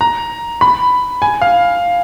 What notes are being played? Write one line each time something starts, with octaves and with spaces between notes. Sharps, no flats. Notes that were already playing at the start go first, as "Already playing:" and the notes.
A#5
B5
G#5
F5